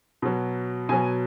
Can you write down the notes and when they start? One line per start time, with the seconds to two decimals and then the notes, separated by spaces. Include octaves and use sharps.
0.22 B2 F#3
0.89 B2 F#3 G#5